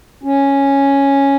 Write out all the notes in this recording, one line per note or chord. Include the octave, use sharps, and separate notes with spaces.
C#4